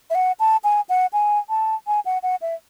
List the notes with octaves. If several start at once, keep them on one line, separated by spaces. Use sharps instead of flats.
E5
F#5
A5
G#5
F#5
G#5
A5
G#5
F#5
F#5
E5